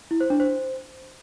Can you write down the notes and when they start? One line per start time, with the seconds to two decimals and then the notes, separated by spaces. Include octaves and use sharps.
0.11 E4
0.20 C5
0.30 D4
0.40 C5